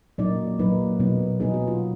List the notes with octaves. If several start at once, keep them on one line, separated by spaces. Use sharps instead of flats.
A#2 F#3 A#3 D#4 D5
A#2 F#3 A#3 D#4 B4
B2 F#3 B3 D#4
B2 F#3 B3 D#4 G#4
F#4
F4